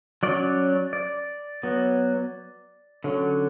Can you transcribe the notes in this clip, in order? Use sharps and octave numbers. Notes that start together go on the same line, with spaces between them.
F#3 C#4 D5
D5
F#3 B3
D3 F#3 C#4